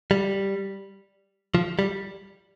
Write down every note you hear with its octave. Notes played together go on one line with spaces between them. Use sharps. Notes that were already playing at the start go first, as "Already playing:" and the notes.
G3
F3
G3